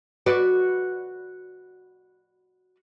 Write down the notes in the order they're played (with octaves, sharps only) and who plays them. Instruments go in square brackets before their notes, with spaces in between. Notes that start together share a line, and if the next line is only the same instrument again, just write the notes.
[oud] F#4 B4 D5